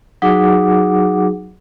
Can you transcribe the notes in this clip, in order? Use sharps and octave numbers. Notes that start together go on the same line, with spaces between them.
F#3 D#4 F#4 G#4 F#5 D6